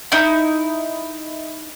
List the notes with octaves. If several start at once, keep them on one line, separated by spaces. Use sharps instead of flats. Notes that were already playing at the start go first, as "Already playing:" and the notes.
D#4 E4